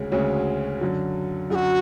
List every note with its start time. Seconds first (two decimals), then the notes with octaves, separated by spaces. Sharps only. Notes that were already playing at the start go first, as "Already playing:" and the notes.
Already playing: D2 C#3 G#3 C#4
0.12 D2 C#3 G#3 C#4 F#4
0.81 F#2 D3 F#3
1.50 F#2 D3 F#3 F#4 G#4